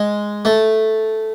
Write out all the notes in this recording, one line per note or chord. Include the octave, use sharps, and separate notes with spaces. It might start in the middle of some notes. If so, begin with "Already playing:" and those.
Already playing: G#3
A3